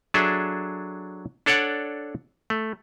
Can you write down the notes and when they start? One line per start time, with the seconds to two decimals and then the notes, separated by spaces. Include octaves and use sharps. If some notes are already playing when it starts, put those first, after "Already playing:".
0.14 F#3 D4 G#4 A4 E5
1.46 D4 A4 C#5 D5 F#5
2.50 A3